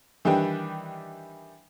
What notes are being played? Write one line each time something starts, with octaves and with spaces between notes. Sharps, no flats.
D#3 E3 G3 D4 G4 B4